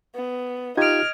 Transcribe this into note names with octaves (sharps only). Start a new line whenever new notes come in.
B3
D#4 F4 G4 D#5 F6 G#6 D7